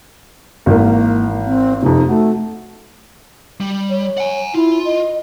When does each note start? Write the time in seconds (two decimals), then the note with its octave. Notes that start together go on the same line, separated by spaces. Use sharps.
0.66 G#1 E3 A#3 A#4
1.46 C4
1.83 F2 C3 D#4
2.09 A3 F#4
3.60 G3
3.90 C#5
4.18 F#5 G#5
4.54 E4 F4
4.85 D#5